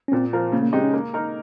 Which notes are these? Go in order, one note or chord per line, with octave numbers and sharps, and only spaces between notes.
C#4
A#2 C4
F3 C4 F4 A#4
C#3 A#3
A#3
G#3 C4 D#4 G4
C#4
A#3
D#4 A#4